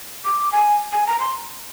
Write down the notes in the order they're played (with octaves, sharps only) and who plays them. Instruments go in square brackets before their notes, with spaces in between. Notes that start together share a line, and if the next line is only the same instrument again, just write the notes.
[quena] D6
G#5
G#5
A#5
C6